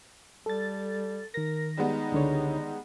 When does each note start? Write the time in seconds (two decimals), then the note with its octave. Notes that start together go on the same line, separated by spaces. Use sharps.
0.46 G3 A4 A6
1.34 D#3 A#4 A#6
1.77 G3 G#3 B3 D#4
2.12 C#2 D3 C#5